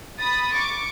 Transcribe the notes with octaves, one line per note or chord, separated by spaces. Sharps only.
B5 D#6 A6
C#6 D6